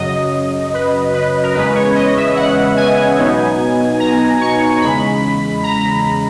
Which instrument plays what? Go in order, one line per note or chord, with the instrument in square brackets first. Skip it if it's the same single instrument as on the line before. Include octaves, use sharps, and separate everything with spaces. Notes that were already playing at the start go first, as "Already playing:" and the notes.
Already playing: [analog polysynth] F#2 C#3 F#3 D#5
B4
B4
A#4
E2 C#3 G#3 C#4 B4
C#5
D#5
E5
F#5
G#5
B2 F#3 B3 D#4
A#5
C#6
E2 C#3 G#3 B5
A#5